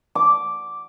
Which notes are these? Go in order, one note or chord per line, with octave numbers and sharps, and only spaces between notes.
D6